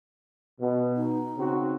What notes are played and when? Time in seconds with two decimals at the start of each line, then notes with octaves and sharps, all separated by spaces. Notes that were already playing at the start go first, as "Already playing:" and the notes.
0.61 B2
0.97 D#4
1.37 C#3 C4 F#4